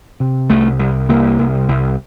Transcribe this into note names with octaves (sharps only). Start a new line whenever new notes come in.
C3
C2 A3
C2
C2 A#3
C2
C2